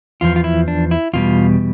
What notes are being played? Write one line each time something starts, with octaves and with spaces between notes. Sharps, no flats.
E2 D3 F3 F4
F4
E4
D4
E4
E2 B2 G3 F4